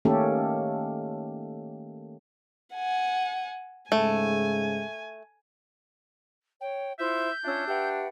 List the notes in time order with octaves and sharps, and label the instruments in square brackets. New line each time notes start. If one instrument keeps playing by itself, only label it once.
[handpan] D#3 A3 A#3 C#4 G4 A4
[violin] F#5 G#5
[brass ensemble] G#2 C#3 G#3 [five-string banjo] A3 [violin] G#5
[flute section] C#5 [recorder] G5
[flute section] E4 F4 C5 [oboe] E5 [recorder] G6
[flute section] C#4 F4 [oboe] D4 [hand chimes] E5 E6
[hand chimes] G4 E5 [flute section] B4 F#5 G5